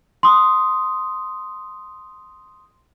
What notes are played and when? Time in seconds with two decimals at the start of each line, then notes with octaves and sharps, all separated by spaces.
0.23 C6 D#6